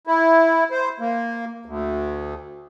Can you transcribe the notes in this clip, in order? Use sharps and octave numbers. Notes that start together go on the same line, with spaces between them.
E4
C5
A#3
D2